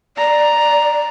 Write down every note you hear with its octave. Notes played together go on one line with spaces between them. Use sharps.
D5 A#5